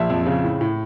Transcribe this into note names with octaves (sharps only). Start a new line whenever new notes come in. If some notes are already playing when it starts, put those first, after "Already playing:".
Already playing: A#1 E5
F2
C#3
A2
A2